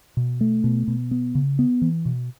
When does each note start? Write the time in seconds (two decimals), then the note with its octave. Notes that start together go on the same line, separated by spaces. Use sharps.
0.17 B2
0.41 A3
0.64 B2
0.88 B2
1.11 B3
1.35 C#3
1.59 B3
1.82 E3
2.05 B2